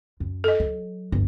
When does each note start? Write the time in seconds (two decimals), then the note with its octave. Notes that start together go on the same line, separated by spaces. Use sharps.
0.20 F#2
0.44 A4 D#5
0.60 F#3
1.12 G1 D2